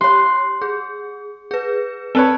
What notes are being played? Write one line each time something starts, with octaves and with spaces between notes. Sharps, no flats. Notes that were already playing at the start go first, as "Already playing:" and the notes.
G4 C#5 C6
G#4
G#4 B4
C4 A4 B4 C#5